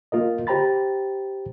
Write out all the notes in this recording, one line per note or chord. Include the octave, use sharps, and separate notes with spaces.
A#3 F4 A#4 D#5
G4 C5 G5 A#5 B5 A6